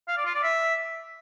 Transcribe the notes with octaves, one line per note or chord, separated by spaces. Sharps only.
F5
D5
F4
D5
E5